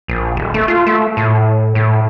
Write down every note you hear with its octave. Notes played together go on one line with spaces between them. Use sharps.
A#1
D#1
A3
F4
A3
A2
A2